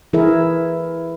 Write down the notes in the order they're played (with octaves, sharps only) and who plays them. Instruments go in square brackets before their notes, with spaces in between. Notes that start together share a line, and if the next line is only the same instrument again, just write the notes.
[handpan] E3 E4 G#4 A#4 E5